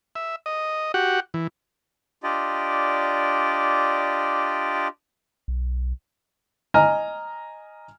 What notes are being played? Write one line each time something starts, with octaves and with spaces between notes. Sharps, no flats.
E5
D#5
F#4 G4 F#5
E3
D4 F4 G4 D5 D#5
B1
D#5 G#5 A#5 F6